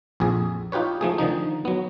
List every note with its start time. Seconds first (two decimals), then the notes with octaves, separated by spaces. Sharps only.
0.20 A#1 F2 G#4
0.72 D#4 F4 G4 B4 C#5
1.01 F3 A3 G#4
1.18 D3 D#3 F3 D#4
1.65 F#3 B3